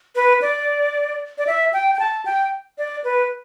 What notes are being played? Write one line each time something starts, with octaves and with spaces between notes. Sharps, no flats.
B4
D5
D5
E5
G5
G5
A5
G5
D5
B4